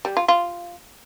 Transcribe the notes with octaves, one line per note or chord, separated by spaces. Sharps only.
G3
F4
F4